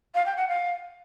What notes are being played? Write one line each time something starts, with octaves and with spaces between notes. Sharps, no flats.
F5
G5
F#5
F5